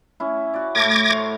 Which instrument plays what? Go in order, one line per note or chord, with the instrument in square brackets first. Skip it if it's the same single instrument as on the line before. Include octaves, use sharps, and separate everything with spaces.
[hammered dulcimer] C#4 E4
F#4 D5
[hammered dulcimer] A2 A3 [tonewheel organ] D6 G#6 A#6
[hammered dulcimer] C5 C#5